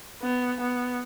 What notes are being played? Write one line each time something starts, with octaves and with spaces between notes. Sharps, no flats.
B3
B3